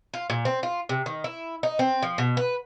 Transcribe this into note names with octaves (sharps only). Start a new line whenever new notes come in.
F4
A#2
C4
F4
C3
D#3
E4
D#4
C4
F3
B2
B4